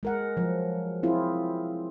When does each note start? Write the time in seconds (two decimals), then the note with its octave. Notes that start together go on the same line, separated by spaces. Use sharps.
0.03 G#3 A#4 F#5
0.37 F3 F#3
1.03 C4 E4 F4 G#4